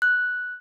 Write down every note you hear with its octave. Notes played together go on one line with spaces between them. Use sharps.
F#6